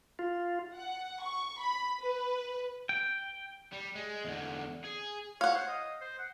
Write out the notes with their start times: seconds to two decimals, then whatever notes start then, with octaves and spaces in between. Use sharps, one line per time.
0.19 F4
0.75 F#5
1.23 C#6
1.60 B5
2.02 B4
2.89 G5
3.72 G3
3.95 G#3
4.25 E2 D3
4.85 G#4
5.41 C#5 F5 F#5
5.55 C5
5.68 D#5
6.01 C5
6.19 F#5